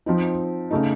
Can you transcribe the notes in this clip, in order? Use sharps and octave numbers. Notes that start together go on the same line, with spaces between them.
F3 C4 D#4
C#3 A3 D#4